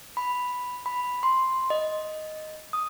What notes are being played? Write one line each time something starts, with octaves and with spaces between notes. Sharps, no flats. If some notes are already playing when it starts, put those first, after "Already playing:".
B5
B5
C6
D#5
D#6